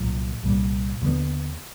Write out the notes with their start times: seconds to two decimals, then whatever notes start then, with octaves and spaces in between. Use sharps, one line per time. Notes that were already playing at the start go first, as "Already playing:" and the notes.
Already playing: C2 A#2 F#3
0.43 C2 A#2 G3
1.01 D#2 D3 G3 B3